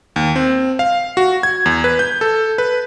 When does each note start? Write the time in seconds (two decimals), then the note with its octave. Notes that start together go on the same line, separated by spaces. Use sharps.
0.16 D#2
0.36 C4
0.79 F5
1.17 F#4
1.43 G#6
1.66 E2
1.84 B4
1.99 G6
2.21 A4
2.58 B4